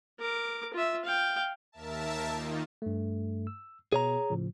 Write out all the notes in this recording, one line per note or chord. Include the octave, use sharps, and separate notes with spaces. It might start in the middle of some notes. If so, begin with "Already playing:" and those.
A#4 D6
F4 E5
F5 G5
D#2 A#4 E5 A5
D#3 A#3 D#4 F4
G2 A3
E6
B2 B3 G#4 C#5 A#5
A2 C#3 F3